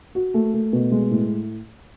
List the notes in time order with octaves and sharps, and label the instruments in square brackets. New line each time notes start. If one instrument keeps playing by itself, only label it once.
[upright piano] F#4
A3
A3
B2
G#3
A2